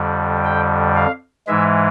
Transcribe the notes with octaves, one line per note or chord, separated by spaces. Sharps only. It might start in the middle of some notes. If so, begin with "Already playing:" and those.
Already playing: F2 D3 G3
G5
F5
G#2 E3 G#3 E5